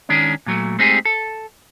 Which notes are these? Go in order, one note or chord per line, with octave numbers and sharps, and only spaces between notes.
D#3 G#3 C#4 D4
A#2 F#3 A3
G#3 A3 C4 D#4 G4 G#4
A4